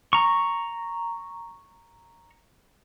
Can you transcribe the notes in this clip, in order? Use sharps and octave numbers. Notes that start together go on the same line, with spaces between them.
A#5 C#6